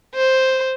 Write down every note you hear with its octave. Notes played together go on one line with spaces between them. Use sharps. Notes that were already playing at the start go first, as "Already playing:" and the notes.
C5